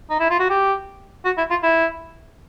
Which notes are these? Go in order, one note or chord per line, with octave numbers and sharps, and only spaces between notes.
D#4
E4
F4
F#4
G4
F#4
E4
F4
E4